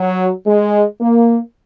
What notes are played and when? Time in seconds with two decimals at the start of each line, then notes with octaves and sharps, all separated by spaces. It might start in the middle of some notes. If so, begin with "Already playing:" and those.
Already playing: F#3
0.46 G#3
0.99 A#3